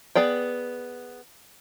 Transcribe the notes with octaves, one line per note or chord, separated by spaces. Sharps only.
B3 G#4 D5 G5